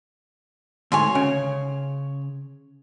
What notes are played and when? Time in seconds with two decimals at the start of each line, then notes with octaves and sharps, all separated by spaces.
0.92 D2 G#2 C#5 G#5 C6
1.15 C#3